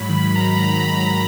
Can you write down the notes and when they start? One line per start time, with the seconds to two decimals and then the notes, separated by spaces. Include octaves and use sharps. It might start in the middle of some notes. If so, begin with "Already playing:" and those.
Already playing: G#2 F#3 B5
0.09 D#3
0.15 B5
0.25 G#2
0.35 D#3 A#5
0.56 G#2 A#5
0.72 G#2
0.88 D#3